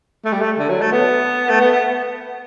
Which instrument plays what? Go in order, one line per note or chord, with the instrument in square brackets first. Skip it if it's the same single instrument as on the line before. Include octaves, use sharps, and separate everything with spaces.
[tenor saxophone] A3
G3
A3
D3
F#3
A3
B3
A3
B3
B3